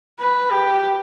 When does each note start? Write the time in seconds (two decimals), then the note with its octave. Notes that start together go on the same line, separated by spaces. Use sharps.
0.19 B4
0.52 G4